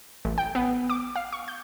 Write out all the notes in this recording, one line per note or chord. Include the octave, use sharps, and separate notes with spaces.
A1
G5
B3
D6
F5
C#6
G6